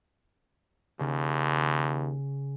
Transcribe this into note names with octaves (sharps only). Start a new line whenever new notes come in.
D#2 C#3